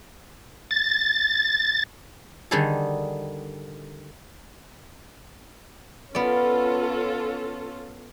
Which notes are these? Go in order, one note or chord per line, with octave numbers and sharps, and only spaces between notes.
A6
D3 D#3 G3 D#4 G#4 A4
B3 C#4 F4 A4 D5